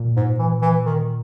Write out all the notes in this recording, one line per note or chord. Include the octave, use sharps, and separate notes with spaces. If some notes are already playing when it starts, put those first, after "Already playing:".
Already playing: A#2
G#2
E3
E3
D#3